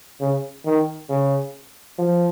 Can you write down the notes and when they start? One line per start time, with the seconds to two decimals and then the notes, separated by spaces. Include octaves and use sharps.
0.21 C#3
0.66 D#3
1.10 C#3
1.99 F3